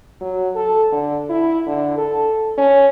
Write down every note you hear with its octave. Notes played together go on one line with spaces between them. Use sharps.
F#3
A4
D3
E4
D3
A4
C#4